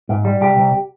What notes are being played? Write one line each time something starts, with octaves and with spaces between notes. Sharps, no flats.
G#2
G3
C2 G4
C2